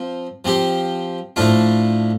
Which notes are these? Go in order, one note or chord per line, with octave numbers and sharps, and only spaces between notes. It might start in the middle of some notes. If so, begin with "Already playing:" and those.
Already playing: F3 C4
F3 C4 G4
A2 F3 D4 F4